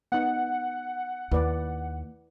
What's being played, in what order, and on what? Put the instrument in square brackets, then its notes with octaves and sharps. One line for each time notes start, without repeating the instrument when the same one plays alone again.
[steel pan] B3 D#4 [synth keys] F#5
[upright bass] D#2 [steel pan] E4 B4 D5